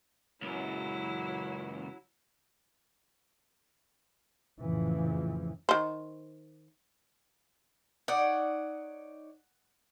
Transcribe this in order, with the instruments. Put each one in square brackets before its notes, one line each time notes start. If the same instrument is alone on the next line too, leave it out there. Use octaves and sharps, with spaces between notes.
[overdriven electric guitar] C#2 F#2 [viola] F#3 E4
[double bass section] F2 A2 C#3 E3 F3
[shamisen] D#3 C5
[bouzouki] D#4 C#5 D5 [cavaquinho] F#5